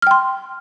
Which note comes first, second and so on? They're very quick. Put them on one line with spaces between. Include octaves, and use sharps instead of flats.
F6 G5 C6